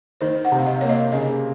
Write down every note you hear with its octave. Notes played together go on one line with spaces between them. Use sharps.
D#3 C5
F#5
C3
F5
D#5
A#3 C#5
D#5
C#3 D#5